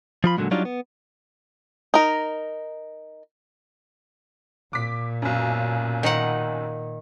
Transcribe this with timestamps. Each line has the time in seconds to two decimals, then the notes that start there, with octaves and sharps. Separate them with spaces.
0.24 F3 F4 B5
0.37 A#2 D3 E3 F#3 G#3
0.51 F#3 G3 D4 D#4 F4
0.65 B3
1.94 D#4 A#4
4.73 A#2 D6 B6
5.22 B1 F#2
6.03 D#3 D#4 F#5